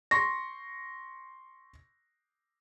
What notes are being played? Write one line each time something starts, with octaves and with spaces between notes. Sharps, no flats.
C6 C#6 A#6